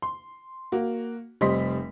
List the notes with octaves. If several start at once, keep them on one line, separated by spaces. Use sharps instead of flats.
C6
A#3 F#4
F1 G3 C4 D#5 C6 B6